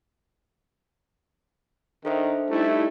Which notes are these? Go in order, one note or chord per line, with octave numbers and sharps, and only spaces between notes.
D#3 D4 A4 C5 E5
G3 A3 D#4 E4